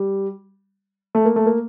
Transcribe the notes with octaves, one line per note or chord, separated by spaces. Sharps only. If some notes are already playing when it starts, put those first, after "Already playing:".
Already playing: G3
A3
A#3
A3
A#3